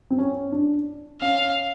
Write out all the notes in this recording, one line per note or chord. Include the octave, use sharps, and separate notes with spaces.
C4
C#4
D4
C#4 F5